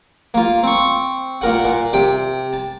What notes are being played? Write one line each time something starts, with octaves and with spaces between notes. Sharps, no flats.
A#3 F4
C4 C#6
A#2 A#4 F#5
A#2
C3 G5
A5